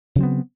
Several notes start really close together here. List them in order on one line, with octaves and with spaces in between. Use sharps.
C#3 F#3 C4 B3